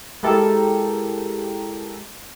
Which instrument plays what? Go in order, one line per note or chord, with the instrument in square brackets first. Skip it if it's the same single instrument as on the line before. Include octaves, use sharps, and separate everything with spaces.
[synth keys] G#3 E4 G4 A4 A#4